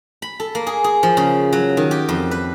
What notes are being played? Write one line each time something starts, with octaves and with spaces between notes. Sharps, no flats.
B5
A4
A#3
G#4
G#4
F3
C#3
F#3
D#3
G4
F2
B4